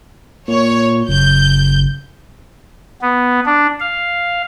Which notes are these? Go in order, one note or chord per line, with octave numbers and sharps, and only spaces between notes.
A#2 C#5
F#1 G6
B3
D4
F5